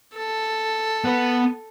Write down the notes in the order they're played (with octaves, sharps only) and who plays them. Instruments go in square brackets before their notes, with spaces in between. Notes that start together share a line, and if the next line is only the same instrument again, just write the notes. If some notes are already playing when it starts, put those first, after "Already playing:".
[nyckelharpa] A4
[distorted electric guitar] B3 B4